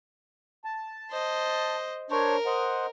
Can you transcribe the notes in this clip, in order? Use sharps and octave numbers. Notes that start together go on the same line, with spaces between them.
A5
C5 D#5
D4 A#4 C5 C#5
C5 D#5 F#5